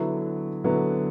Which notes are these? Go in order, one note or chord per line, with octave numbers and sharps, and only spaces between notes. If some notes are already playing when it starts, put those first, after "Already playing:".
Already playing: D3 F#3 B3 E4
D3 F#3 B3 E4